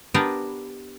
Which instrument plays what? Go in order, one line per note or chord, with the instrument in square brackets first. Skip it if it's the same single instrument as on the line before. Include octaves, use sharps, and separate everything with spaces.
[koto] B3 D4 G4 A#4 B4